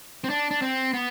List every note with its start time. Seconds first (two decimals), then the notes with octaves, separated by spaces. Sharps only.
0.24 C4
0.30 D4
0.51 D4
0.62 C4
0.94 B3